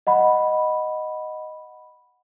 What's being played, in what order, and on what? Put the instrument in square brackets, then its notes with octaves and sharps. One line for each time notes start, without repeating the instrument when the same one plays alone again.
[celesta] D#5 F#5 B5